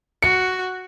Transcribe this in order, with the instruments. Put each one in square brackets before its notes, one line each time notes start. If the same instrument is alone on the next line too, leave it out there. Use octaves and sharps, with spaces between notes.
[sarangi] F#4 [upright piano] C#7